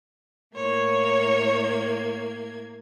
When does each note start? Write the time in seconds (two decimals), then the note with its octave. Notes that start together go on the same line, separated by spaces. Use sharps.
0.56 A2 A#3 C#5 G#6